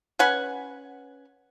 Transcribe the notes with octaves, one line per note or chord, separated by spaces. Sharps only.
C#4 B4 F#5 G#5